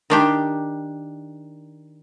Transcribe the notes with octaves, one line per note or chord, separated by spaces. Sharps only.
D#3 D4 G4